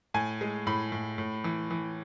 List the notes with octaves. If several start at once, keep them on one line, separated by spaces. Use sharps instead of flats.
A2 G#5
G#3
A2 B5
A2
A2
E3
E3